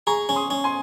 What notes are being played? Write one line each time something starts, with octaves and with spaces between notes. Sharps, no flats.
G#4 A#5 C#6
C#4
C6 D#6
C#4
G#5 C6